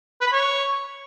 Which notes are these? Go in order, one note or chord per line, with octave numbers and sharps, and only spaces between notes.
B4
B5
C#5